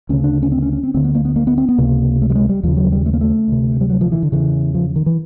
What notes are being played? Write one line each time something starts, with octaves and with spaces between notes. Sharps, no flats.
D2 C#3 C#4
D4
C#4
C4
C#4
C#4
C4
D2 D3 C4
B3
A#3
B3
A#3
B3
C4
B3
C#2 C3 A#3
A3
G3
G#3
G3
D#2 C#3 F3
F#3
G3
A3
A#3
A3
D2 C3
G3
F#3
F3
E3
D3
E2 C#3 E3
F3
D#3
E3